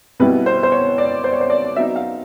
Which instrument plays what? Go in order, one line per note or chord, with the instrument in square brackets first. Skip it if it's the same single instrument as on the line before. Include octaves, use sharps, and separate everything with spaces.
[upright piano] B2 G3 B3 E4 B4
C5
C5
C#5
D5
C5
C#5
C5
D5
F#3 B3 D#4 E5
F5